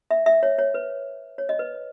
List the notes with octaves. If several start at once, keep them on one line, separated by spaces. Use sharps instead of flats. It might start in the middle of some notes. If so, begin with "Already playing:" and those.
E5
E5
C#5
C#5
B4
C#5
D#5
B4